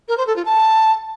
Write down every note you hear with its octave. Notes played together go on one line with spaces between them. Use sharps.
A#4
C5
A4
F4
A5